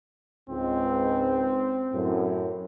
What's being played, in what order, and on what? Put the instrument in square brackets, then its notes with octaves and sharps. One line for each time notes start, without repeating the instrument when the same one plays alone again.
[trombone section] C#2 G#2 [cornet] C4
[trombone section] F#2 A2